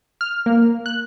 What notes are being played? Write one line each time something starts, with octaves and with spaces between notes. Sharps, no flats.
F6
A#3
F#6